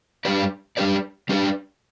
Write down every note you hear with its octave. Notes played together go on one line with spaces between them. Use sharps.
G3 D4 G4 B4 D5
G3 D4 G4 B4 D5
G3 D4 G4 B4 D5